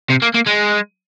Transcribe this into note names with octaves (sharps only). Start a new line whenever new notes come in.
C3
A#3
A#3
G#3